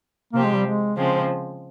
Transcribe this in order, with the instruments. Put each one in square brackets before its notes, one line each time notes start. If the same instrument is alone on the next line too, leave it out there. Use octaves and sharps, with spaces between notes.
[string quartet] C3 F3 C4 G4 [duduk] A#3
[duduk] G#3
G3
G#3
[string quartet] C#3 F3 G#3 C4